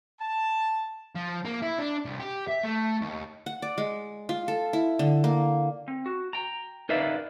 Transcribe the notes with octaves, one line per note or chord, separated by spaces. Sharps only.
A5
F3
A#3
E4
D4
C2
G4
E5
A3
D#2
F#5
D5
G#3
F4
A4
E4
D3
A#3
C4
F#4
G5 A#5
D#4 A#4 B4 D5 E5 F5